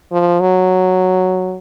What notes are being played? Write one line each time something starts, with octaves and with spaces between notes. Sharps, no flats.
F3
F#3